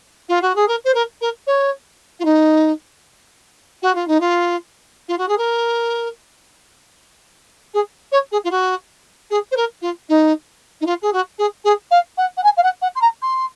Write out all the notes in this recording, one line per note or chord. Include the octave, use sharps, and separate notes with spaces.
F4
F#4
G#4
A#4
C5
A#4
A#4
C#5
F4
D#4
F#4
F4
D#4
F4
F4
F#4
G#4
A#4
G#4
C#5
G#4
F4
F#4
G#4
C5
A#4
F4
D#4
D#4
F4
G#4
F#4
G#4
G#4
F5
F#5
F#5
G#5
F5
F#5
F#5
C6
A#5
C6